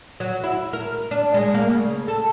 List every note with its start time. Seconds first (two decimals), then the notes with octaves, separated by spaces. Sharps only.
0.20 F#3
0.43 E4
0.73 A#4
1.11 D4
1.34 G#3
1.54 A#3
1.69 C#3
2.08 A4